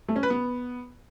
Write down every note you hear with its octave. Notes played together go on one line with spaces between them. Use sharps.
A3
C#4
B4
B3